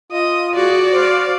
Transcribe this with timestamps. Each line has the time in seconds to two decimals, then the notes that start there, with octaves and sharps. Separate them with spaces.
0.12 F4 D#5 D#6
0.55 F#4 G#4 D5
0.93 C5 F5 D6